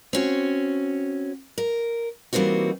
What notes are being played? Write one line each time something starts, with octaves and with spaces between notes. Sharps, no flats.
C4 C#4 F#4
A#4
E3 G3 A#3 C4 D#4 F#4